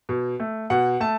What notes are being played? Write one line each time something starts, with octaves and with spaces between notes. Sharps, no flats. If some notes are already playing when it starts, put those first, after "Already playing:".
B2
A3
B2 F#5
A3 A5